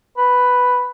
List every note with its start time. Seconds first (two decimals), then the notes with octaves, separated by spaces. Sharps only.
0.17 B4